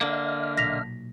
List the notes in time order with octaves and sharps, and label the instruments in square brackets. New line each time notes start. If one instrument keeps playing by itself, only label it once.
[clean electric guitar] D3 A#3 [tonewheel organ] D#5 E5 F6
[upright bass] B1 A#2 [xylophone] A#6 B6 F7